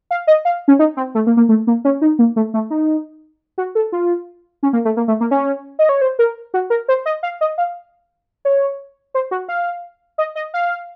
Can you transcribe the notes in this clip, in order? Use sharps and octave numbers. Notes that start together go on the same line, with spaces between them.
F5
D#5
F5
C#4
D#4
C4
A3
A#3
A#3
A3
A#3
C#4
D#4
A#3
A3
A3
D#4
F#4
A4
F4
C#4
A#3
A3
A#3
A3
A#3
C#4
D#5
C#5
C5
A#4
F#4
A#4
C5
D#5
F5
D#5
F5
C#5
C5
F#4
F5
D#5
D#5
F5